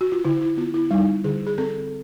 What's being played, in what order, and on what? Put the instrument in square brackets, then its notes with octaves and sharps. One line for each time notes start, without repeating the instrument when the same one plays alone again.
[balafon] F#4
F4
D3 E4
E4
B3 F4
E4
G3 D#4
D3 G#4
G#4
C4 A4